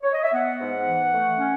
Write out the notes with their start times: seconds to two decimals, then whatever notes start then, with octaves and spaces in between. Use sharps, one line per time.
0.03 C#5
0.13 D#5
0.23 E5
0.33 B3 F#5
0.60 G#2
0.86 E3
1.12 A3
1.39 C#4